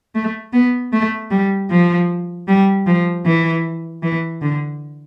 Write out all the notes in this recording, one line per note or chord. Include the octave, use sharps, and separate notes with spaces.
A3
B3
A3
G3
F3
G3
F3
E3
E3
D3